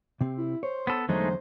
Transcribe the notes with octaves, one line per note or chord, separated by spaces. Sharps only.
C3 C4
E4
C5 C#5
B3 A4
E2 D3 F#3 G#3 A3 D#4 C5